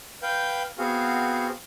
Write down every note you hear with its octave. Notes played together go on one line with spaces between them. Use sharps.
B4 F5 G5 G6
B3 C4 F#4 G#4 F5